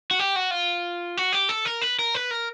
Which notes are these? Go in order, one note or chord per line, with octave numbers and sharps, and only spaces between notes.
F#4
G4
F#4
F4
F#4
G4
A4
A#4
B4
A#4
B4
A#4